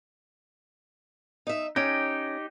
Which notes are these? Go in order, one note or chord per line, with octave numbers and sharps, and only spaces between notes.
D#4 E5
C#4 D#4 G4